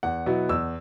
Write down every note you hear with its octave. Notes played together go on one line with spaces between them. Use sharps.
E2 F#5
B2 F#3 B3 E4
E2 E6